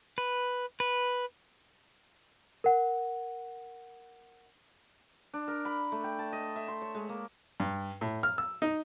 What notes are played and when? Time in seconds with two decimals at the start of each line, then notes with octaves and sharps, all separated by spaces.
0.18 B4
0.80 B4
2.64 A#4 F#5
5.33 D4
5.48 A#4
5.65 B5
5.92 A3
6.04 G5
6.19 A5
6.33 D#5
6.56 E5
6.68 C6
6.82 C#5
6.95 G#3
7.09 A#3
7.60 G2
8.01 A2
8.23 F6
8.38 E6
8.62 D#4